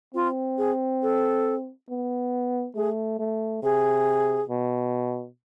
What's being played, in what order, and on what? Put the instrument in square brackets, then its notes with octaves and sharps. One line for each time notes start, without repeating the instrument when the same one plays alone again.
[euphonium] C4 [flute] F4
[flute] G#4
A4
[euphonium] B3
[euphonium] A3 [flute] G#4
[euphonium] A3
[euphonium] C3 [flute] G#4
[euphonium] B2